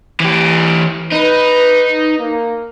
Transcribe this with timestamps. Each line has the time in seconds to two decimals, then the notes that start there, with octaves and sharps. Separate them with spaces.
0.20 E3 G4
1.12 D#4 B4
2.19 A#3